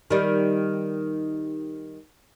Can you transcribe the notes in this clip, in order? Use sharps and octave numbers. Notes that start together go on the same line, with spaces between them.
D#3 G3